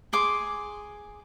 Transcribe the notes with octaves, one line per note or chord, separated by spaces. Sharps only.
G#4 C6 D6